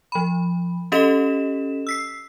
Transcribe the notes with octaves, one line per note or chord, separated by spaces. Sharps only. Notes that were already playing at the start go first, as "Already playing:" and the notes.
F3 B5
C#4 G4 A4 D#5 B6 E7
E6 B6 C7